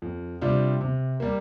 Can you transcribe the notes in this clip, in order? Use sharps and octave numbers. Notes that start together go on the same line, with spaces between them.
F2
C3 G3 D4 F4
C3
G3 A#3